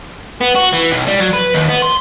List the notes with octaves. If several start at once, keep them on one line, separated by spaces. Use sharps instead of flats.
B3
F#4
E3
B1
G3
F#3
B4
D#2
B3
C6